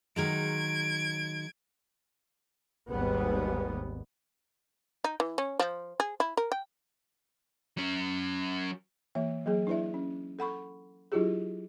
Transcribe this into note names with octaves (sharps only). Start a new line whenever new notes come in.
D#3 F#3 G#3 G#6 D7
G#1 D#2 G#2 G3 B3
D#4
E3
C#4
F3
G#4
E4
A#4
G5
F#3 C#4
E3 A#3 E5
F#3 A#3 G#4
D4 E4 B4 D5 E5
C#4
A4 F#5 B5 C#6
F#3 D4 E4 F4 G4 G#4